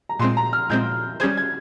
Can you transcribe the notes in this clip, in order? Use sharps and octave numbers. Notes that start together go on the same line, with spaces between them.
A#5
A#2 G#3 C4 C6
A#5
F6
A#2 G#3 C4 G6
G3 C#4 G#4 C5 G#6
G#6